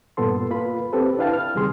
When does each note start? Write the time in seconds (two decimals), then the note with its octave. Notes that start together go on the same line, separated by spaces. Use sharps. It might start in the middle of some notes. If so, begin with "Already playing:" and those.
0.17 G2 A#2 B3 A4 C6
0.50 A#3 F4 B4 B5
0.93 C4 G4 A4 B4
1.19 D4 E4 B4 F5 G5 A5
1.33 F6
1.55 C#2 C3 D#3 G3 G#4 C6